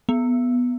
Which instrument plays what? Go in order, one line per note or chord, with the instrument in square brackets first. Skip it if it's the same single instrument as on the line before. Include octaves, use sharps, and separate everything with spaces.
[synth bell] B3